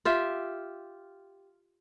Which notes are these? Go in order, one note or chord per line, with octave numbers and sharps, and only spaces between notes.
F4 G4 E5